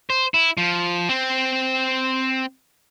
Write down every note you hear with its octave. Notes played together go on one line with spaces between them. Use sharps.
C5
E4
F3
C4